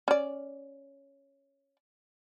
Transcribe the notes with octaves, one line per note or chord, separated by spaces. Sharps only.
C#4 D5